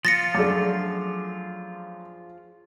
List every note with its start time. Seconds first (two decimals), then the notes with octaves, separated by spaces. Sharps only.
0.05 F3 F4 A6 A#6 C#7
0.35 F#2 A3 D4 G#4 D6